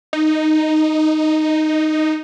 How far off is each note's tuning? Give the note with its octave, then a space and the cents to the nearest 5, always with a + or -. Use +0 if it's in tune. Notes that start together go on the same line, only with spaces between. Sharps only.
D#4 -5